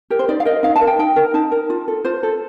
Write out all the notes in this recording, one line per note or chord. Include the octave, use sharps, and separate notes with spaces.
G4 A#4
C5
D#4 D5
F5
A#4 D#5
D#4 F5
A5
A#4
G5
D#4 G5
A#4
D#4 A5
A#4
F4
A4
F4 C5
A4